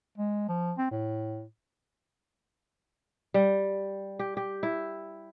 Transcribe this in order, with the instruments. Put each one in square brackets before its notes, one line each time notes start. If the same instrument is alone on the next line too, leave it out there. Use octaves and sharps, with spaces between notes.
[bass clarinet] G#3
F3
C4
A2
[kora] G3
G4
G4
E4